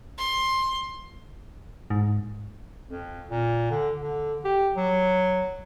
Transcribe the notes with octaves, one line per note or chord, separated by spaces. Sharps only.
C6
G#2
F2
A#2
D3
D3
G4
F#3